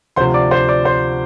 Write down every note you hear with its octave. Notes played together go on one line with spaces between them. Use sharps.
D2 C3 F3 C5 C6
D5 D6
C5 C6
D5 D6
C5 C6